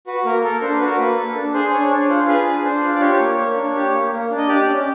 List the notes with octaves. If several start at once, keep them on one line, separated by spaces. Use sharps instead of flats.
F#4 B4
A#3 A#4
A4 A#4
D4 C5
B4
F#4
A#4
A#3 B4
A4
D4
G#4 C5
D4 C#5
D4 C#5
F4 C5
G#4 B4
D4
D4 C5
F4
D5
G4 C#5
A#3
A#3
D4
G4
A#3
A#3
D4
D#5
G4 D5
C#4